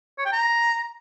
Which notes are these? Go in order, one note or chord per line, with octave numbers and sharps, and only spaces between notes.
C#5
G5
A#5